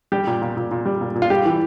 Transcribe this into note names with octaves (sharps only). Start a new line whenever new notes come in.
G3 G4
A#2
A#2
A#2
A#2
G3
A#2
A#2
F4
G3 G4
E3